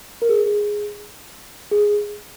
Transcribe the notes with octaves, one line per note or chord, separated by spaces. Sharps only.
A#4
G#4
G#4
G#4